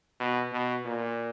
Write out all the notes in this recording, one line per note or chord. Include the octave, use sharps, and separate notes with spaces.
B2
B2
A#2